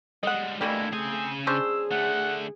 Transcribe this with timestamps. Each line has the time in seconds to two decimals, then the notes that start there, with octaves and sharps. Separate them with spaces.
0.23 G3 G#3 D#5 F#5
0.61 B2 D3 E3 G3 A3 A#3 E4
0.93 C#3 C4 G#4 G#5
1.47 C#4 D4 G#4 C5 E6
1.91 D3 A3 F#5